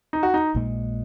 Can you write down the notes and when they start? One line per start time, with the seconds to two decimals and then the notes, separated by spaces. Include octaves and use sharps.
0.13 D#4
0.23 F#4
0.34 D#4
0.55 A#1 A#2 G#3